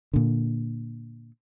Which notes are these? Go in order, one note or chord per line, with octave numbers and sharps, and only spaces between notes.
A#2 D3